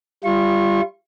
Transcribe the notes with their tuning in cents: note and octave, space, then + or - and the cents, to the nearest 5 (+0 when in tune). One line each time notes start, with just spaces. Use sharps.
G3 +0 F4 -30 C#6 -35